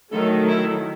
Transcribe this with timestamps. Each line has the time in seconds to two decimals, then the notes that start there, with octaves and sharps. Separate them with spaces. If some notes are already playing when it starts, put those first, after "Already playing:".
0.11 D#3 F#3 A3 A4
0.48 E4